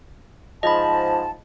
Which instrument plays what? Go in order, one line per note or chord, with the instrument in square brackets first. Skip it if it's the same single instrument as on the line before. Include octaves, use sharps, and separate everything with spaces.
[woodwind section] G#2 F3 A5 [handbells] D#5 B5